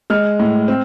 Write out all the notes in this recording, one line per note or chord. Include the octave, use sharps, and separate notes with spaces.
G#3 F6
A2
C4